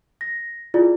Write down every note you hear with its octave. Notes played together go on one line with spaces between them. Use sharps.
A#6
E4 F4 G#4 D5